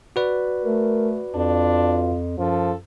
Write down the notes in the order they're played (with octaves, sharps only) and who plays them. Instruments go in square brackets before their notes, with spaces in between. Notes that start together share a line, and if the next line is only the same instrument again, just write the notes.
[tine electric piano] F#4 B4 D5
[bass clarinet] A3 [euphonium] A#4
[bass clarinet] F2 [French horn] D4 [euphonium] F4
[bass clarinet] F#2 [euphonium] F3 [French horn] A4